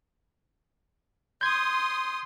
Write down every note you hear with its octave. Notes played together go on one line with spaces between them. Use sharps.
C6 D#6 G6 G#6